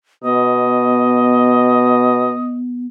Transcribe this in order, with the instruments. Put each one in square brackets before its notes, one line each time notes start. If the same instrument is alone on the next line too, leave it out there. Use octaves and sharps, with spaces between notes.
[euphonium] B2 [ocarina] B3 [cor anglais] D#5